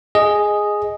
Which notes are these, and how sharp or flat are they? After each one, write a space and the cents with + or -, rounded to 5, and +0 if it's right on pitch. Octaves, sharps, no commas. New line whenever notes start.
G#4 +0 D#5 +0